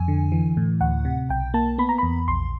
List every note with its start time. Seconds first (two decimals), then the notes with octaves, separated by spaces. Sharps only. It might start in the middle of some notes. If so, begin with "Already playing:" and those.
Already playing: F2 G#5
0.08 D3
0.32 E3
0.57 A2
0.81 D2 F#5
1.05 C3
1.29 B1 G5
1.54 A#3 A5
1.78 B3 B5
1.89 A#5
1.98 E2 B5
2.27 A#1 C6